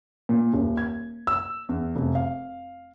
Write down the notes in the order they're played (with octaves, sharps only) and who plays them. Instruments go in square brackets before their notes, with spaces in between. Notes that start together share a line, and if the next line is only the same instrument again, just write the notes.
[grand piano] A#2
D#1
G#6
E6
E2
F1
F5